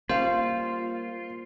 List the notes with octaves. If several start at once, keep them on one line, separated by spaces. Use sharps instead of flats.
G3 A#3 C#4 F4 C5 F5